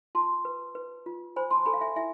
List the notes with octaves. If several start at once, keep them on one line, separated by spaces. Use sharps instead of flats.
F4 A5 C6
B4
B4
F4
C5 G#5 B5
A5 C6
A4 G#5 B5
F5
E5 G#5
E4 E5 G#5